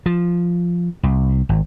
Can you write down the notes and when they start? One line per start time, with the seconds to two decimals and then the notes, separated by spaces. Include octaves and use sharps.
0.06 F3
1.03 C2
1.49 G#1